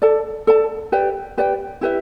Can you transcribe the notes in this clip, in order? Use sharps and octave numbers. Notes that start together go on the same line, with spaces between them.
A4 D5 A5
A4 D5 A5
G4 B4 D5 G5
G4 B4 D5 G5
E4 G4 B4 E5